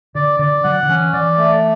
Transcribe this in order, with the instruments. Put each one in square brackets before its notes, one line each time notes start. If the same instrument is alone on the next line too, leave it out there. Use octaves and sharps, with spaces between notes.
[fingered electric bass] D3 [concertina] D5
[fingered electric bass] D3 [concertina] D5
[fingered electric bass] F#3 [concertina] F#5
[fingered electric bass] D3
[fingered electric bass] E3 [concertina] C#4
[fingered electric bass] E3 [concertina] D5
[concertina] A3